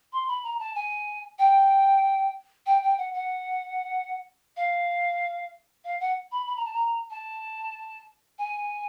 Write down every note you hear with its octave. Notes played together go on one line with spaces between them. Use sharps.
C6
B5
A#5
A5
G#5
G5
G5
G5
F#5
F#5
F5
F5
F#5
B5
B5
A#5
A5
A#5
A5
G#5